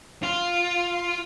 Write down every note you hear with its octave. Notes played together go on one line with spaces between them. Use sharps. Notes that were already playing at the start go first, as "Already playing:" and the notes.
F4